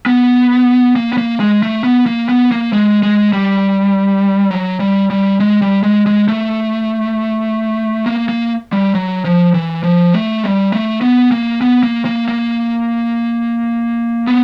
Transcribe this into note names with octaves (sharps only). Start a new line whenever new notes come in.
B3
A#3
B3
A#3
G#3
A3
B3
A#3
B3
A#3
G#3
G#3
G3
F#3
G3
G3
G#3
G3
G#3
G#3
A3
A#3
A#3
G3
F#3
F3
E3
F3
A3
G3
A3
B3
A#3
B3
A#3
A#3
A#3
B3